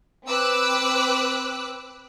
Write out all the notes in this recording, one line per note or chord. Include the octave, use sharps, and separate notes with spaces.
C4 B4 D6 E6 F#6